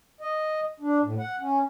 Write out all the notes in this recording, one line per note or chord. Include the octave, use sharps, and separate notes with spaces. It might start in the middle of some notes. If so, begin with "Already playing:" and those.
D#5
D4
A2
F#5
C#4